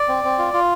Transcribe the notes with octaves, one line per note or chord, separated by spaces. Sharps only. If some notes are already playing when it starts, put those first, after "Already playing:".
Already playing: D5
C4
C4
F4
F4